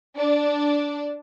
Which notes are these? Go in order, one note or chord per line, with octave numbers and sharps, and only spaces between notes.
D4